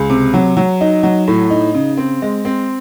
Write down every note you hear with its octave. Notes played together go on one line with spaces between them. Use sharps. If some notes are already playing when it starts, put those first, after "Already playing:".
Already playing: C#2
C3
F#3
F#3
D#4
F#3
A2
D#4
C#3
C4
G#3
C4